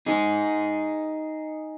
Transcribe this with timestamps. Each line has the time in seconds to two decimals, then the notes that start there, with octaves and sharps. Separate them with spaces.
0.06 D#4 G#4